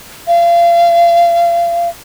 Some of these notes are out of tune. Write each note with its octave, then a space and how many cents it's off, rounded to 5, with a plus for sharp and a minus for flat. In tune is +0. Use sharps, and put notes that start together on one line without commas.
F5 -30